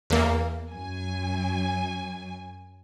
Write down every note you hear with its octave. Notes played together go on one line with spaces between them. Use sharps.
E2 E3 A#3
F#2 G#5